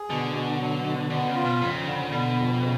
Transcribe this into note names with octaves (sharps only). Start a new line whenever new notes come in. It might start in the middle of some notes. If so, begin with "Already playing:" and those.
Already playing: G#4
B2 D3
B2
F#3
B2
D3 B3
C#3
F4
B2
F2 C#3
D3
B2 D3
F2
C#3